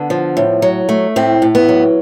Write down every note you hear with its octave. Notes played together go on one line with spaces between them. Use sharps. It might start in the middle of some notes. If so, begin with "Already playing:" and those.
Already playing: D3 B3
F3
A2
F#3
A3
A2 C4
A2
B3
F#3